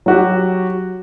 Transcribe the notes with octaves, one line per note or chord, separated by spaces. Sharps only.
F#3 F#4 G4